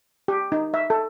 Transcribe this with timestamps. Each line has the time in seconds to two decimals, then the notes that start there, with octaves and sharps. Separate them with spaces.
0.28 G4
0.52 D#4
0.74 E5
0.90 A4